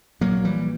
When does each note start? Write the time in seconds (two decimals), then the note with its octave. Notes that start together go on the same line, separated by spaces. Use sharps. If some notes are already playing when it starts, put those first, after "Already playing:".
0.21 A#1 A#2 F#3 A#3
0.45 E3 G3